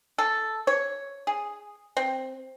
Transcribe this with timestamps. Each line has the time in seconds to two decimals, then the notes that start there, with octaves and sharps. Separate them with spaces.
0.18 A4
0.67 C#5
1.27 G#4
1.97 C4